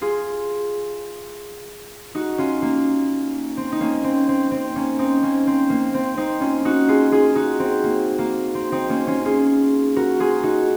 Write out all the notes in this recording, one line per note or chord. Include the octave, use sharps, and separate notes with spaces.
F4 G#4
D#4 F#4
C#4 F4
A#3
C4
D#4
A#3 C#4
C4
C4
C4
A#3 C#4
C4 D#4
A#3 C#4
C4
A#3
C4
C4 D#4
C#4 F4
D#4 F#4
F4 G#4
F4 G#4
D#4 F#4
C4
A#3
A#3
C4
C4 D#4
A#3 C#4
C#4 F4
F4 G#4
F#4 A#4
F4 G#4
D#4 F#4